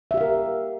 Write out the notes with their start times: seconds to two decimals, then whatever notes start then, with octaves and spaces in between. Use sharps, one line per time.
0.11 E5
0.14 G4
0.17 F5
0.21 A#4